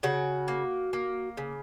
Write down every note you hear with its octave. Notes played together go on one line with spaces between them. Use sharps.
C#3 F#4
A#3
A#3
C#3